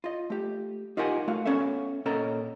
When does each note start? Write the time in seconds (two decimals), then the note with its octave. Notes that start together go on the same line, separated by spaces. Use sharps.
0.04 F4 D#5
0.30 A3 G4
0.97 D#4 F4 G4 A#4 F#5 G#5
1.28 A3 F4 F#4 F5
1.45 B3 C#4 A4 E5
2.06 A#2 C#4 A4 A#4 D#5 A#5